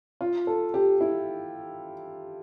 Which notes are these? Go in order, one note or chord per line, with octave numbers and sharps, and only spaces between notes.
F4
A4
G4
E4